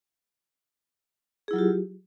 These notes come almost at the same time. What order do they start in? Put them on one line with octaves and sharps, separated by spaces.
G#4 E4 F#3 F4 G4